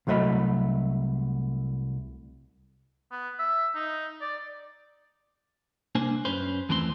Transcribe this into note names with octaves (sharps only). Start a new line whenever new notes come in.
C2 F#3 A3 C#5 D#5 B5
B3
E5
D#4
D5
C2 A#3 D4 C5 G#5
F#2 C#4 B4 C5
D#2 E3 A3 C4 A#5 C6